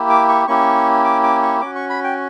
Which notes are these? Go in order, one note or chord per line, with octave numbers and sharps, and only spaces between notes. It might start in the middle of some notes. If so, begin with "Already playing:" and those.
Already playing: A#3 E4 G4
D6
C#6
A#3 C#4 E4 G4 C#6
D6
D6
C#6
C#4 F#4 D6
C#6
B5
G5